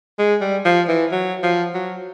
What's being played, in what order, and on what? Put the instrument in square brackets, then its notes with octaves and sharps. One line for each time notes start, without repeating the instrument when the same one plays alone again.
[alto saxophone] G#3
G3
F3
E3
F#3
F3
F#3